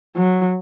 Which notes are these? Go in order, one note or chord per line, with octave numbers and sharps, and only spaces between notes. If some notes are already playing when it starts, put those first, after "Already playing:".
F#3